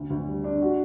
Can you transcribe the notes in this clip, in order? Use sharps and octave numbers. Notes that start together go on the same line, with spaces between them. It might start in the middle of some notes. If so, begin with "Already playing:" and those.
Already playing: D2
D2
G3
D4
F#4